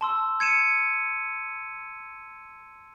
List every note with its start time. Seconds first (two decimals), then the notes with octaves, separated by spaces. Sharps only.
0.01 A5 C6 E6
0.40 G#6 C#7 D#7 E7